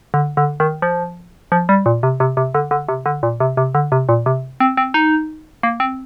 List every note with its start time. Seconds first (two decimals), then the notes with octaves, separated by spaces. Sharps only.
0.14 D3
0.37 D3
0.60 D#3
0.82 F3
1.52 F3
1.69 G3
1.86 A#2
2.03 C3
2.20 C3
2.37 C3
2.54 D3
2.71 D3
2.89 C3
3.06 D3
3.23 A#2
3.40 C3
3.57 C3
3.75 D3
3.92 C3
4.09 A#2
4.26 C3
4.60 C4
4.77 C4
4.94 D#4
5.63 A#3
5.80 C4